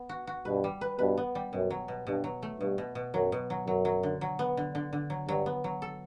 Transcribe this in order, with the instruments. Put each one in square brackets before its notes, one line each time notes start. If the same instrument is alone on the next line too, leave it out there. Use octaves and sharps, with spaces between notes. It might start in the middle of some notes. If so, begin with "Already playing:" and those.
Already playing: [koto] B3
F#4
F#4
[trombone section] G2 B2 [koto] B4
[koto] G3
B4
[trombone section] G2 B2 [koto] B4
[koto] B3
G3
[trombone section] F#2 [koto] B2
[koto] F#3
B2
[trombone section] G2 [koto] B2
[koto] F#3
A3
[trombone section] G2 [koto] B2
[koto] B2
B2
[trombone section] F#2 [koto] F#3
[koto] B2
F#3
[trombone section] F#2 [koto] F#3
[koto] F#3
D3
F#3
B3
D3
D3
D3
F#3
[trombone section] G2 [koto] F#3
[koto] B3
F#3
A4